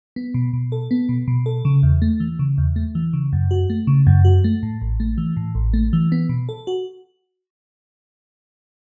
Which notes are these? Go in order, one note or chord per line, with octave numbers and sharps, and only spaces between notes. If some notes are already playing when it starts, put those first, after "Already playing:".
B3
B2
B2
A4
B3
B2
B2
A4
C#3
E2
A3
E3
C#3
E2
A3
E3
C#3
F#2
F#4
A3
C#3
F#2
F#4
A3
A2
A1
A3
E3
A2
A1
A3
E3
B3
B2
A4
F#4